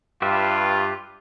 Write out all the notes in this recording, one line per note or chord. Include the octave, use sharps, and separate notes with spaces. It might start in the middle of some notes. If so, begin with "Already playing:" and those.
G2 F4 G4 B4 E5